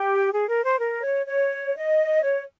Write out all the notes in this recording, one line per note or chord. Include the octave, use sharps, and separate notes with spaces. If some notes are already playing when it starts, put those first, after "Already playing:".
Already playing: G4
G#4
A#4
C5
A#4
C#5
C#5
D#5
C#5